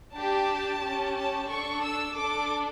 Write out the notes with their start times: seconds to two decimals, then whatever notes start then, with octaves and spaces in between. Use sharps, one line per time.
0.13 D4 G4 A5
0.81 C#4 G4
1.14 A5
1.48 D4 A4 C#6
1.83 E6
2.16 D4 A4 D6